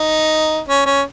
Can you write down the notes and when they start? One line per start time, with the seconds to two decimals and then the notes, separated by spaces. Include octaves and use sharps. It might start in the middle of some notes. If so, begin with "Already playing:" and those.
Already playing: D#4
0.68 C#4
0.85 C#4